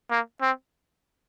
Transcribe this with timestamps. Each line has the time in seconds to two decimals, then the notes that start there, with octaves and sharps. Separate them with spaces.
0.11 A#3
0.42 C4